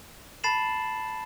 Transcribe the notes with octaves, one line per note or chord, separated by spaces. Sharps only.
A5 B5 A6 C7 E7 F#7